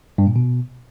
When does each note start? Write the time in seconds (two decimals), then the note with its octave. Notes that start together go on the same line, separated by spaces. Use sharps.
0.18 G2
0.27 A#2
0.36 B2